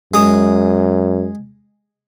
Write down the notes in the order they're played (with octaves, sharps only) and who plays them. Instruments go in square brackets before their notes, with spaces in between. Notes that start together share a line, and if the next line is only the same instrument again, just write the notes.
[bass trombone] F#2 [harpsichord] G#3 D#6